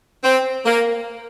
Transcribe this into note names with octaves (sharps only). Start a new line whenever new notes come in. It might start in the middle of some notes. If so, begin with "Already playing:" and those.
C4
A#3